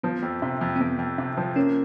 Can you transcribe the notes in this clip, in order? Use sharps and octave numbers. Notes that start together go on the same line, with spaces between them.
F3 B3
F2
C3
F2
C4
F2 B3
F2
C3
F3
A#3 C#4